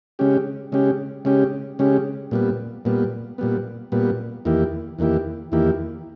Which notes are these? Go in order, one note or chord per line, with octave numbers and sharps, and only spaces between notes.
C#3 G#3 C#4 G4
C#3 G#3 C#4 G4
C#3 G#3 C#4 G4
C#3 G#3 C#4 G4
A#2 G3 B3
A#2 G3 B3
A#2 G3 B3
A#2 G3 B3
E2 D#3 A#3 E4 G4
E2 D#3 A#3 E4 G4
E2 D#3 A#3 E4 G4